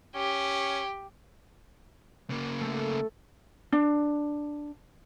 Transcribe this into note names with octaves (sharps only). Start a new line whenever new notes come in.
C#4 G4
C#3 A#3
A3
D4